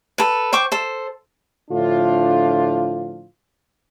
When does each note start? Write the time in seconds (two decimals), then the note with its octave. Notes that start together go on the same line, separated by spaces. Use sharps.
0.18 A4 B4
0.53 C5 G5 C#6 D6
0.72 A4 C5
1.71 A2 D3 F3 D4 F4